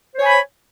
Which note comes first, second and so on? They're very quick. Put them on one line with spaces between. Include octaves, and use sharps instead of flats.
C5 C#5 G#5 B5